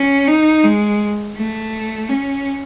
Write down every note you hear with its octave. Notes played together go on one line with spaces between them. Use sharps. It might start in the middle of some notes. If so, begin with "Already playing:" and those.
Already playing: C#4
D#4
G#3
A3
C#4